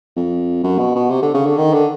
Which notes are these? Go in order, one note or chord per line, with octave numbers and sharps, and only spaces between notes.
F2
F#2
B2
B2
C3
D3
C#3
D3
D#3
D3